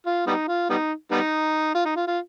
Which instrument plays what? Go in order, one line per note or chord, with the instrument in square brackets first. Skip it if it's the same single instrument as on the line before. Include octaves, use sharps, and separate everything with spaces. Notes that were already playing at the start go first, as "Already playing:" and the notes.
[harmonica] F4
G3 B3 D#4
F4
G3 B3 D#4
G3 B3 D#4
F4
D#4
F4
F4